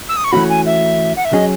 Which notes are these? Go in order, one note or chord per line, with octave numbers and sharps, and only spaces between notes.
E6
D#6
C#6
E3 A3 C#4 F#4 B5
G#5
E5
F#5
E5
F#3 C#4 G#4 D#5